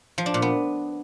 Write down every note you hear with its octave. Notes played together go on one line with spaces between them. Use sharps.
F3
D4
A#2
B3